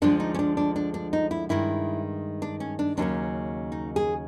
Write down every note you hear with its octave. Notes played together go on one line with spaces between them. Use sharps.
D2 D3 F3 G#3 D4
D#4
C#4
D4
D4
D4
D4
D#4
E4
G2 D#3 G#3 E4
D4
C#4
D4
D#2 C#3 F#3 A#3 C#4 D4
D#4
G#4